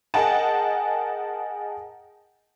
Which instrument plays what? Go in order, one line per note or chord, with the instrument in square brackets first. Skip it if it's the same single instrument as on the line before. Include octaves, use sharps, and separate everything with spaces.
[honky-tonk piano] G#4 A#4 D#5 F#5 G5 A5